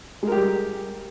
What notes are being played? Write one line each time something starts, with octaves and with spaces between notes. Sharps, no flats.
G3 G#3 G4 A#4